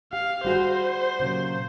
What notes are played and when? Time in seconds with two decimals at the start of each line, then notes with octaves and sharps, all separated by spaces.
0.13 G4 F5
0.45 G3 F#4 G#4 C5
1.19 A#2 C#3 F#3